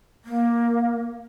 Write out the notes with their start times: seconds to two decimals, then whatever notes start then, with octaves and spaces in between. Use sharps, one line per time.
0.25 A#3